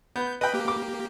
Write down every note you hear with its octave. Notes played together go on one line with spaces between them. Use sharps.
B3 G6
B4 D#5 G5 B5
A#3 G4
D6